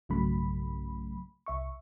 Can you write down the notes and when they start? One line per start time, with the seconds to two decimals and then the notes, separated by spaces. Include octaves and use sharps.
0.09 B1 G2 C#3 F#3 A3 B5
1.46 C2 E5 C#6